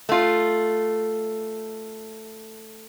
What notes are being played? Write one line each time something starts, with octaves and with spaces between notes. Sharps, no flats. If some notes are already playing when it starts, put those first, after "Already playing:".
A3 F4